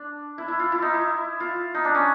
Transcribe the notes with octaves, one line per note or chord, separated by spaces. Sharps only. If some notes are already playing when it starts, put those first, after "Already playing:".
Already playing: D4
E4
E4
F4
E4
D#4
E4
F4
D#4
D4
C#4